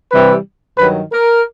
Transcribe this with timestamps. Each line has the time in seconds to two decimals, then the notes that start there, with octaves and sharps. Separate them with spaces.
0.12 C3 E3 G3 B4
0.78 G2 D#3 F#3 B4
1.12 A#4